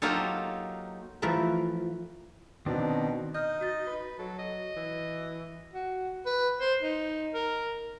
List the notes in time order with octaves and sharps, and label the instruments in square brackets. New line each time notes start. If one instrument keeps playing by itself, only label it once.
[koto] F#3 A#3 D#4 F4 G4 A4
[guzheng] E3 F3 A3 E4 A#4 B4
[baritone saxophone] B2 [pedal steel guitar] D#3 C4 D4
[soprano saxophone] D#4 [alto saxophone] D#5 [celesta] F6 G6
[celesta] F#4 A6
[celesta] F#4 [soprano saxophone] B4
[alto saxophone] F#3 [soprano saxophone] A4
[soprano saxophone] D#5
[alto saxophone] E3
[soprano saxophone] F#4
B4
C5
D#4
A#4